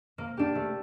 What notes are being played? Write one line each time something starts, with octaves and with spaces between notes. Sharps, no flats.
A#3
D4 G4
A3